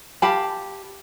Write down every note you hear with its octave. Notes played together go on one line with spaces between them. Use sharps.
G4 F5 A5 B5